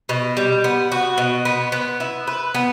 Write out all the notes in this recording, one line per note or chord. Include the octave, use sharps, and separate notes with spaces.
B2
G3
B3
F#4
B2
B3
B3
E4
B4
B3